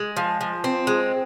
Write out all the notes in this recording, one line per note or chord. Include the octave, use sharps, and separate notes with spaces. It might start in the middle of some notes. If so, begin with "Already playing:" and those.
Already playing: G#3
F3
F3
C4
G#3